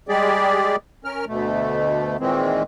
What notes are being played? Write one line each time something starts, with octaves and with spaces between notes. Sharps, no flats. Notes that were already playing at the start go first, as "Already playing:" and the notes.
G3 G#3 G4 G#4 D5
C#4 A#4 F6
D2 B2 A3
A#2 D#3 E3 G#3 C4